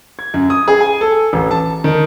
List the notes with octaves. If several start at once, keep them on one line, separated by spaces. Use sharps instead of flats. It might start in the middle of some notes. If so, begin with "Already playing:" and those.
G#6
F#2
D#6
G#4
G#5
A4
A1
A5
D#3